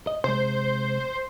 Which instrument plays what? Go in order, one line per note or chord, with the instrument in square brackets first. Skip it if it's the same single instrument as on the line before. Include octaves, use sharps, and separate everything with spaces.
[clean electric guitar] D#5
[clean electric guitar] C3 G#3 [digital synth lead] C5